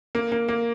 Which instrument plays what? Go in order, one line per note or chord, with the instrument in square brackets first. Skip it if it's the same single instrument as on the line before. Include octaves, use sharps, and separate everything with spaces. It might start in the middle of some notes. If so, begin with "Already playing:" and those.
[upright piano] A#3
A#3
A#3